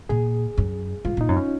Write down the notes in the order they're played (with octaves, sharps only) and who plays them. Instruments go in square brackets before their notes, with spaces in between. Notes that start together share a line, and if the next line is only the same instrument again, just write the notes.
[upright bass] A#2 [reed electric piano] G#4
[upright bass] F#2
[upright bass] G#2 [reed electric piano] F4
[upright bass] A#2 [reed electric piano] D#4
[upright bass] F#2
[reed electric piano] C#4